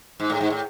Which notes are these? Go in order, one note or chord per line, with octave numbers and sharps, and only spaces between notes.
G#2
A2
G#2
A2